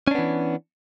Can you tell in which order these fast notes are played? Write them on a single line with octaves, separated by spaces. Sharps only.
C#4 D4 B3 E3